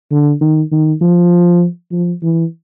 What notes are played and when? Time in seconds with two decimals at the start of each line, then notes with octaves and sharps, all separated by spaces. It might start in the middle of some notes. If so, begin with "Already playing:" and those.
0.11 D3
0.41 D#3
0.72 D#3
1.01 F3
1.92 F3
2.23 E3